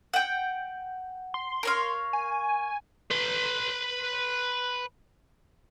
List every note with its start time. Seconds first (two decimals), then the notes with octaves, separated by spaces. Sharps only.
0.14 F#5 G5
1.34 C6
1.63 A#4 C#5 F5
2.13 G#5
3.11 B4 C6